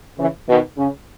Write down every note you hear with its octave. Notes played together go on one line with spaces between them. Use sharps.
C#3 E3
B2 D#3
C#3